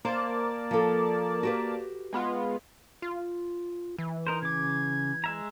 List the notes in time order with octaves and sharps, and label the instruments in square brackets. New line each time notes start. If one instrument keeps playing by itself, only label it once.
[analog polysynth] A#3 D5 A5 [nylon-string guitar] C5
[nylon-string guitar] F3 A4
F#4 G4 B4
[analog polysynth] G#3 B3 F4
[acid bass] F4
E3
[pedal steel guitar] D#4 A#4 C5
[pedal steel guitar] C#3 D6 [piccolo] G#6
[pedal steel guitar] G#3 E5 A#5